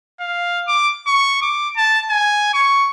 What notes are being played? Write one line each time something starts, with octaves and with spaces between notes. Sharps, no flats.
F5
D6
C#6
D6
A5
G#5
C#6